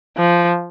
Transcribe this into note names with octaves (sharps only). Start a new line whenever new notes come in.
F3